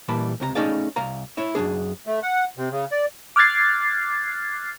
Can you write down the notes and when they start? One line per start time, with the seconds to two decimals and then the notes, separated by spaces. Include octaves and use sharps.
0.08 A#2 E3 G3 A5 B5
0.40 C#2 C3 F#4 A#5
0.55 A3 C#4 D#4 G#4 D5 F5
0.96 C2 F5 A#5
1.37 E4 C#5 E5
1.55 F#2 D#3 D4 G#4
2.07 A3
2.22 F#5
2.58 C3
2.71 C#3
2.92 D5
3.36 D6 F6 F#6 G#6 A6 C7